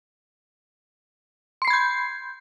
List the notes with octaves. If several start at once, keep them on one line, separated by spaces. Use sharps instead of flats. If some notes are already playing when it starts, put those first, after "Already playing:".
B5 C6 G6 G#6 C7